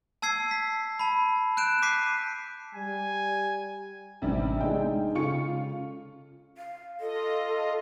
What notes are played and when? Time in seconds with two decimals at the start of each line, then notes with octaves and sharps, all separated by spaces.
0.22 A5 E6 G#6 C7
0.51 B6
0.99 A5 B5
1.57 F#6 G6 D7 E7
1.82 D6 B6 C7 D#7
2.75 G3 G#5
4.22 A1 C3 G3 D4
4.61 G#3 D4 D#4 G5
5.15 C#3 F4 A4 C#6 C#7
6.58 F5
7.00 F4 A4 D#5